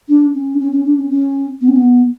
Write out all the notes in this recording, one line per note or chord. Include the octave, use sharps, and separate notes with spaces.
D4
C#4
D4
C#4
C#4
D4
C#4
C#4
B3
C#4
B3